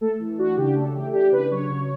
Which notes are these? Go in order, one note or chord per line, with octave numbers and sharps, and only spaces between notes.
A3 A4
E3
D4 F#4
C#3 G4
A3 A4
E3 G4
D4 G4
C#3 B4
F#3 C#5
C#3